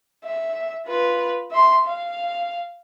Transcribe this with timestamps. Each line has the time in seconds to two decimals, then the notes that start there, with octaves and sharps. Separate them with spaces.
0.24 E5
0.87 F4 B4
1.51 E5 C6
1.85 F5